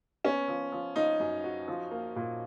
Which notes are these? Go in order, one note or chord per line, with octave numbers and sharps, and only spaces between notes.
B3 C#4
F3
F3
F3 D#4
F#2
F#4
F3
A#3
A#2